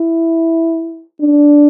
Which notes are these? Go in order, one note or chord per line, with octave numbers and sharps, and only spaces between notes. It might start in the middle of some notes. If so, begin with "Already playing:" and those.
Already playing: E4
D4